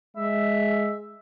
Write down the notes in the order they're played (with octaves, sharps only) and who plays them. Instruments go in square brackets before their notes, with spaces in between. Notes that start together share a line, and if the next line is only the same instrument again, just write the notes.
[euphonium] G#3 [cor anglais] E5